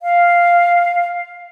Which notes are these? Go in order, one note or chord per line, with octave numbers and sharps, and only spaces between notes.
F5